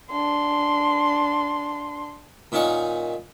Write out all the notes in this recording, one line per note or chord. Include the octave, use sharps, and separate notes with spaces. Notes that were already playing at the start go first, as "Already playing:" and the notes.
D4 C6
A#2 D#3 C#4 D#4 F#5 C#6